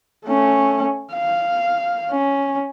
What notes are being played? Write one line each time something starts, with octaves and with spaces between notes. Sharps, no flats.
A3 C#4
F5
C#4